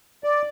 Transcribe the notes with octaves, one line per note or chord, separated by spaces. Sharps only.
D5